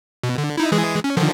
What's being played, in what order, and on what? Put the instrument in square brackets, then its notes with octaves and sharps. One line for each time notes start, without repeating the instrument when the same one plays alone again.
[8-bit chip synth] B2
D3
D#4 E4
E3 G#3 G#4
C#4
D3 D#3 F3